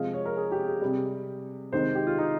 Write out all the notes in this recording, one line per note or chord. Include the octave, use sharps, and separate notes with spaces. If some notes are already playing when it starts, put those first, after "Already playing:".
Already playing: C3 F3 G#3 F5
C#5
A#4
G#4
G4
G#4
C3 G3
C3 D#3 G#3 C5
G4
F4
D#4